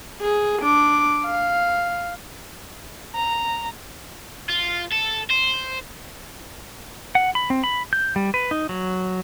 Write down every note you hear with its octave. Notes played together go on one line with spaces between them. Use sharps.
G#4
D4 D6
F5
A#5
F4
A4
C5
F#5
B5
C4
B5
G6
G3
B4
D#4
F#3